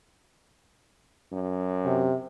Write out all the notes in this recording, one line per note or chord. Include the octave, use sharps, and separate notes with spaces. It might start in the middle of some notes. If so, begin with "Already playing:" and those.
F#2
C3